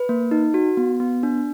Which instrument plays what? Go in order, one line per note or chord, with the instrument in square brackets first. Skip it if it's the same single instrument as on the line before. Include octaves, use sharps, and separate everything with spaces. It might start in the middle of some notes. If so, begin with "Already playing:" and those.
Already playing: [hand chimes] B4
A#3
D#4
F#4
B3
B3
D4